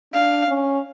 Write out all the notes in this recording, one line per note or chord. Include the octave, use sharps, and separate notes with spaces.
D4 F5
C#4